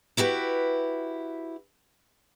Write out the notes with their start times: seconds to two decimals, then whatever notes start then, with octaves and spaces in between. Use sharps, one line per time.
0.17 E4 F#4 G4 B4